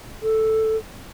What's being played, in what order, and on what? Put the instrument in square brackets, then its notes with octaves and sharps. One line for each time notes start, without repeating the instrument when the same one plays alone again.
[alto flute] A4